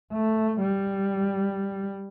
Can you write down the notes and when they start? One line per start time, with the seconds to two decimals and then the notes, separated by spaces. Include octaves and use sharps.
0.13 A3
0.60 G3